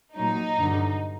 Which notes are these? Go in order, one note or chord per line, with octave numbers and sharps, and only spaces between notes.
A#2 F#3 D#4
G2 D3 F#3